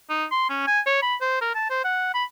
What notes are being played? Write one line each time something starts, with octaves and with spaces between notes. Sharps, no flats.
D#4
C6
C#4
G#5
C#5
B5
C5
A#4
A5
C5
F#5
B5